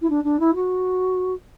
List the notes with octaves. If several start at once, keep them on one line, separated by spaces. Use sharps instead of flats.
E4
D4
D4
E4
F#4